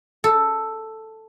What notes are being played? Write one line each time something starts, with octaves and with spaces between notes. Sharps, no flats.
A4